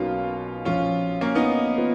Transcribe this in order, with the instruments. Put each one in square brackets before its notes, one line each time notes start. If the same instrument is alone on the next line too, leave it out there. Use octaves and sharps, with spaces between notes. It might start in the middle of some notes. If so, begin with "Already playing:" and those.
Already playing: [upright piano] B1 B2 F#3 A#3 D#4 [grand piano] C#4 F4
[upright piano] A#1 A#2 F3 [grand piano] C#4 F4
[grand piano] A#3 C#4
B3 D#4
[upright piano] F3 B3 F4